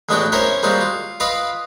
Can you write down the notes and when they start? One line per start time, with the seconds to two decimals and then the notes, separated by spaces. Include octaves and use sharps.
0.09 A1 G#3 B3 D4 F#4 G5
0.32 C#4 E4 A#4 C5 C#5 E5
0.63 G3 G#3 A#3 C4 F4 F#4
0.81 F4
1.20 F4 B4 D#5 F5 B5 D6